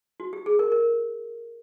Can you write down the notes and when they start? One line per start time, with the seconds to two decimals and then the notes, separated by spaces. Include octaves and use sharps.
0.20 F#4
0.33 G4
0.46 G#4
0.59 A#4
0.72 A#4